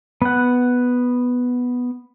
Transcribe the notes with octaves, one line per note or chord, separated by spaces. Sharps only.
B3 F#5